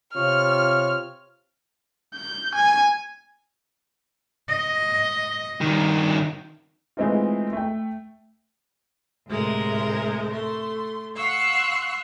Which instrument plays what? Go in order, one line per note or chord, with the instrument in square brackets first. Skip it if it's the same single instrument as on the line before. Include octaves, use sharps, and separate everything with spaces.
[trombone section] C3 C4 F4 [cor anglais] C#5 [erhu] F6
[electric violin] G6
G#5
[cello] D#5
[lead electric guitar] G2 D#3
[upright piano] E3 G#3 A3 C4 D#4 F4
A3 G5
[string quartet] D2 A2 C3 G#3 A#4 C5
A3 C6
F5 F#5 C6 C#6 E6 F#6